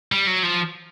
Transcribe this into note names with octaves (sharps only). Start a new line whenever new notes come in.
G3
F#3
F3